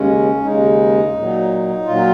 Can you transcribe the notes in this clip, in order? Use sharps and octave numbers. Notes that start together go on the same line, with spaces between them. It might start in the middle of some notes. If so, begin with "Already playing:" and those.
Already playing: D#2 C#3 G#3 C#4
D#2 C#3 G#3 D#4
A#2 F#3
A#2 F#3 F4